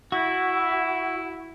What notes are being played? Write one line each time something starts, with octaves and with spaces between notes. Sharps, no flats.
E4 F#4